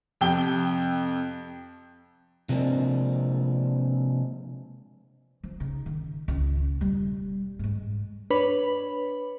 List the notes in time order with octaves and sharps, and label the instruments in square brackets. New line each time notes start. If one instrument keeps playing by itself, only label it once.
[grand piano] F2 C3 G5 G7
[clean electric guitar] C3 F3 G#3 A#3 C4 D4
[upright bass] F3
C#3 D#4
D#3
C#2
E1 G3
G#2 G#3
[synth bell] D4 B4 C#5 B5 F#7